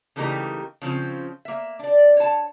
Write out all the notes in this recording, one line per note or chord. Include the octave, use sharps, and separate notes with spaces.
C#3 E3 A3 A#3 D#4 G4
C#3 F3 C4 C#4
A#3 E5
D4 D5
C#5 A5